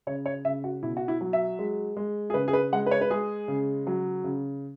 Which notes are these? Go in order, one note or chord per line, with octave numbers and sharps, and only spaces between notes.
C#3 C#5
C#5
C#3 E5
F#4
B2 E4
F#4
E4
F#3
E5
G#3
G#3
G#4
C#3 B4
G#4
B4
G#3 F#5
B4
C#5
B4
G#3 G#4
C#3
F#3
C#3